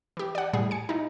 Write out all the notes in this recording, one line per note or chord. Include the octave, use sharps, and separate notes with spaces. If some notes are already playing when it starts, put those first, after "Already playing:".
E3 G4
D5 F#5
A2 G3 G#4
G#5 C#7
D#4 E4